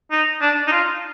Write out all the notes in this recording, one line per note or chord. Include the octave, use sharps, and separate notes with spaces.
D#4
D4
D#4
F4